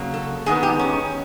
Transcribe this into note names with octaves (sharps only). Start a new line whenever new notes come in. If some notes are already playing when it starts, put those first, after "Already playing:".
Already playing: C#3 F#3 A#3
A4
G#2 D#3 G#3 B3 G#4
G4
C#4